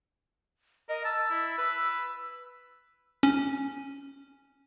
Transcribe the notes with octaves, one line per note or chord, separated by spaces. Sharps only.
A#4 D#5
A5 E6
E4
B4
C#4